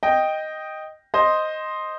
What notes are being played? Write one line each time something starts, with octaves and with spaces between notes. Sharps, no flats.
D#5 G5
C5 D#5